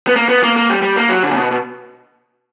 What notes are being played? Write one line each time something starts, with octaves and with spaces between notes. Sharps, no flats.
B3
A#3
B3
A#3
A#3
G3
G3
A#3
F#3
D3
A#2
B2
B2